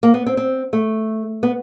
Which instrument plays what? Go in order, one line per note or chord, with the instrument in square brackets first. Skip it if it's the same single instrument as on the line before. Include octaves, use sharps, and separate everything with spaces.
[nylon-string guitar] A#3
B3
C4
C4
A3
B3